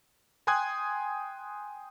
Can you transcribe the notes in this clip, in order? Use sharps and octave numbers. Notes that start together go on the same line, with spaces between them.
G5 G#5 C6 D#6 F#6 G#6